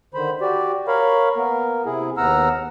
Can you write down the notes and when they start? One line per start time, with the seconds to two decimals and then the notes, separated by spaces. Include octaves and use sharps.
0.14 D3 D#3 C5 B5
0.41 F#4 G4 D5
0.88 A#4 C#5 F5 B5
1.36 A#3 B3 A#4
1.85 C3 E4 G#4
2.17 D#2 B3 F#5 A#5 E6 F6